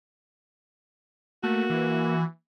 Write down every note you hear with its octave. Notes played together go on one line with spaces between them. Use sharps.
A3 A#3 F#4
E3